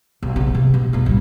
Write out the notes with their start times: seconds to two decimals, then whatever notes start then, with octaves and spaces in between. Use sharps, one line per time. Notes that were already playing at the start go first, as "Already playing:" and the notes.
0.23 B1
0.36 C#3 B3
0.55 C3
0.74 B2
0.93 E1 B3
1.06 A1 G3